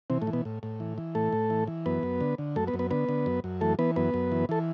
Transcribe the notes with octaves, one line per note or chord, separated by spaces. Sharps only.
C3 E3 C4
A2 A3
E3
B2 B3
A2
A2
E3
E3
A2 A3 A4
A2
E3
E3
F#2 B3 B4
F#2
D3
D3
F#2 A3 A4
B3 B4
F#2
B3 B4
D3 B3 B4
D3
F#2
F#2
E3 A3 A4
E3 B3 B4
F#2 B3 B4
F#2
E3
E3 A4